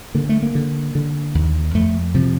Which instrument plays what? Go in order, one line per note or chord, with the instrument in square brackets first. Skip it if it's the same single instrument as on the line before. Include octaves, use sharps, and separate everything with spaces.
[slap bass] D3 A#3
A3
A#3
D3
D3
D#2
F2 A3
C3 F3